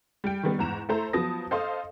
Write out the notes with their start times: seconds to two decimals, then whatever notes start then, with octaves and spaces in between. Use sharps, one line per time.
0.24 G3 G5
0.43 D#3 G3 B3
0.59 E2 G#2 A#5 E7
0.89 A3 E4 A4 C5 A#5
1.13 F3 F#3 B3 A5 D#6 A#6
1.51 A4 C5 D#5 F5 C6 D#6